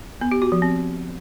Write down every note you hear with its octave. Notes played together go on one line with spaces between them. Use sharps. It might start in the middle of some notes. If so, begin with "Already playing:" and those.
B3
G4
F#4
F3
C4